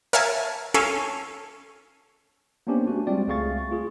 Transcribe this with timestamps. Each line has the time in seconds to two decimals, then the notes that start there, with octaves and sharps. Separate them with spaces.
0.13 A#4 C#5 E5 F5 G#5 A5
0.74 C#4 A4 F5 G#5
2.67 A#3 B3 C#4 D4 G4 C5
2.87 A3 F#4
3.07 G3 G#3 C4 F4 D5
3.27 C#2 A3 G#4 F5 C#6 A6
3.71 F4 G#4